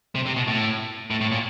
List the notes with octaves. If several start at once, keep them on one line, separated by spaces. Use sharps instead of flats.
C3
C3
B2
A2
A2
A2
A#2